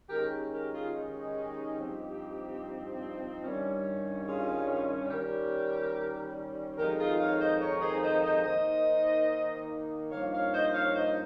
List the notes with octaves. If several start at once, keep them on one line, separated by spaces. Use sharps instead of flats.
D#3 G#3 C#4 G4 A#4
G4 A#4
F4 G#4
D#4 G4
G2 F3 C4 D#4
G2 D#3 G3 C#4
F4 G#4
D#3 G3 C#4 G4 A#4
F2 D#3 G#3 D#4 G4 A#4
F4 G#4
C#5 F5
C5 D#5
A#4 C#5
G#4 C5
C5 D#5
C5 D#5
D#3 A#3 D#4 C5 D#5
G2 F3 A#3 D#4 C#5 F5
C#5 F5
C5 D#5
C#5 F5
C5 D#5